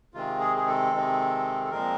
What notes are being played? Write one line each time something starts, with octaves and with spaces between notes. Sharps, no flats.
C3 D#3 G#3 C4 F4
G#4
G#4
A4
C3 D#3 G#3 C4
A4
A#2 F3 G#3 C4 A#4